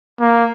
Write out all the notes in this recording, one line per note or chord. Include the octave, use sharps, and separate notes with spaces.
A#3